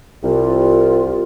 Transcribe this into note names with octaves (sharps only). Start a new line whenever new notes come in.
C2 F4